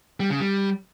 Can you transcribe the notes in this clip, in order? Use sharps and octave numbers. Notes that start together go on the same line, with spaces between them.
G3
C#3
G3